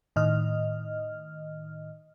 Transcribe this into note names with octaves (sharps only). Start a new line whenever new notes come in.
A2 D#3 D#5 F6